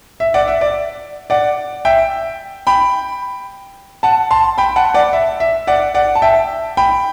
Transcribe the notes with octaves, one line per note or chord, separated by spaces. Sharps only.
E5
D5 F#5
E5
D5
D5 F#5
E5 G5
G5 B5
F#5 A5
A5 C6
G5 B5
F#5 A5
D5 F#5
E5
E5
D5 F#5
D5 F#5
A5
E5 G5
G5 B5